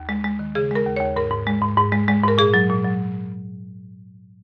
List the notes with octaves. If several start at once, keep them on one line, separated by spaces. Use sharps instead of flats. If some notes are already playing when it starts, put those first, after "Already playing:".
Already playing: D#2
G#3
G#3
D#3
C#3 G#4
G#3 A#4
D#2
D#2 C#5
G#2 A#4
G#2
G#3
G#2
G#2
G#3
G#3
G#2 A#4
A#2 G#4
F#3
A#2
F#3